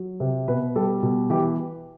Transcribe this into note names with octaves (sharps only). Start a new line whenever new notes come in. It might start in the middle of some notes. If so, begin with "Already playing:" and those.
Already playing: F#3
C3
B2 B4
G3 A4
B2
E3 G4